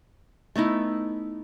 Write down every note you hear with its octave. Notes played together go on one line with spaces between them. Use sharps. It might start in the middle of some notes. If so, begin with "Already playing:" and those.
A3 B3 D#4 E4